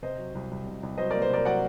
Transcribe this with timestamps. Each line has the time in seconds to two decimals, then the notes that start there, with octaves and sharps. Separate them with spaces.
0.02 C3 C5 D#5
0.18 F#3
0.35 C2
0.51 C2
0.66 C3
0.83 C2
0.98 F#3 C5 D#5
1.10 A#4 D5
1.15 A#3
1.22 C5
1.30 C2 A#4 D5
1.45 F#3 D5 F#5